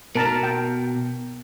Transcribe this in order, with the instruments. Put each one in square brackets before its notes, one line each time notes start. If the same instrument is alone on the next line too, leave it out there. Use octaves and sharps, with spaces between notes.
[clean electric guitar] B2 [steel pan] A#4 A5 A#5
[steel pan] G5